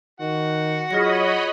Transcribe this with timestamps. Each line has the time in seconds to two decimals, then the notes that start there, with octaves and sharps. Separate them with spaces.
0.20 D#3 F#4 F#5
0.91 F#3 F4 G#4 C#5 D#5 B5 A#6